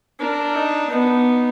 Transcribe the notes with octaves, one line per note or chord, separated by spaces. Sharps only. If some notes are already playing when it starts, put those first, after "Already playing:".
D4 A#4
D#4
B3 D#4